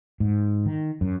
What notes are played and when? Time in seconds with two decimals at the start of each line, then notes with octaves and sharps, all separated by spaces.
0.20 G#2
0.66 D#3
1.01 F#2